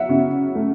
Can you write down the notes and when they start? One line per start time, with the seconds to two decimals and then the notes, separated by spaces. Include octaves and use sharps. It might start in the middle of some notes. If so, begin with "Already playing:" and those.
Already playing: F#3 E5 F#5
0.09 C#3
0.55 A3